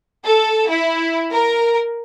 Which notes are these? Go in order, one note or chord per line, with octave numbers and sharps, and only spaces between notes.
A4
E4
A#4